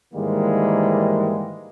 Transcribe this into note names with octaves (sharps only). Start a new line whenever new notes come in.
G#2 D#3 E3 G3 G#3 A#3